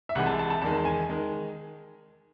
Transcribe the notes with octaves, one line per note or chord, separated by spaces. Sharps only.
E5
C2 C3 E3 G#3 F#5
A5
A5
A5
E2 D#3 G#3 A5
G#5
D#3 G#3